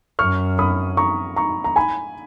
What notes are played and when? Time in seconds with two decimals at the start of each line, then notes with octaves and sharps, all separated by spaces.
0.19 F#2 C#6 F6
0.59 B5 D#6
0.97 A#5 C#6
1.36 A#5 C#6
1.64 A#5
1.76 G#5 B5